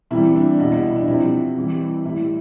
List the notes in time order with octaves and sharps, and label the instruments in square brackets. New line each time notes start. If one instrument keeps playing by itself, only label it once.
[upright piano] C3 E3 G3 E4
D4
B2 G3 E4
E4
E4
D4
C3 F3 E4
C3 E3 G3
A2 G3 E4